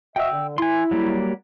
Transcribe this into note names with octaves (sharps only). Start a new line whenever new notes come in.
F#4 D#5 E5 G5 E6
D3
E4 G#5 C6
F#3 G3 A#3